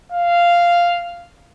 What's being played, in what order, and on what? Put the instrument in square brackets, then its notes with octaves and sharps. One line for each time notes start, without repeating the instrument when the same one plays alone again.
[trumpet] F5